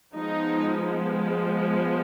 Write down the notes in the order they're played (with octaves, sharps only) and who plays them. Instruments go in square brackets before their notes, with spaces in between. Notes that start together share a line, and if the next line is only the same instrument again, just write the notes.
[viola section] F3 G#3 B3 D#4